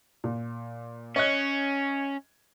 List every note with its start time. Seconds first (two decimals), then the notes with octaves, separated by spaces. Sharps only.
0.24 A#2
1.16 C#4 C#5 D#5 F#6